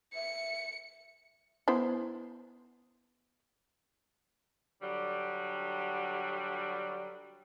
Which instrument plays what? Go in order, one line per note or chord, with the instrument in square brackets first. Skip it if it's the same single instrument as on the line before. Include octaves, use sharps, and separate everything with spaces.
[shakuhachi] E5 [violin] C#7
[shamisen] B3 E4 C5
[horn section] D3 F#3 G3